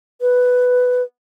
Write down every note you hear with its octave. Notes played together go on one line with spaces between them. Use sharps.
B4